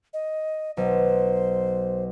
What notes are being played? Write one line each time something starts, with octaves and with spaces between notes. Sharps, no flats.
D#5
B1 C5